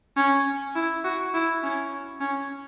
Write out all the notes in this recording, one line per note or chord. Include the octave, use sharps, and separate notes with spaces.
C#4
E4
F#4
E4
C#4
C#4